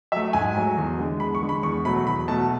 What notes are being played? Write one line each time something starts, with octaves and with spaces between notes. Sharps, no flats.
F#3 A3 E5
G#2 G#5
F#3 A3
E2
D3 G#3
E2 B5
C#6
D3 G#3
B5
E2 C#6
B2 F#3 A3 B5
E2 B5
B2 F#3 A3 A5